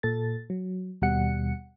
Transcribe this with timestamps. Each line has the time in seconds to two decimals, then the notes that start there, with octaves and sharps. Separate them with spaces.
0.03 A#2 A4 A6
0.50 F#3
1.02 D#2 B2 G3 F#5 C#7